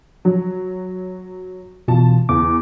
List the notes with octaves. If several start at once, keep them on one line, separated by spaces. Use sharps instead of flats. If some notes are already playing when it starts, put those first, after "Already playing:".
F#3
B2 E3 F4 A5
E2 D6